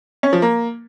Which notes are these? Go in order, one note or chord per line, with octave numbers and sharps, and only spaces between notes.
C#4
F3
A#3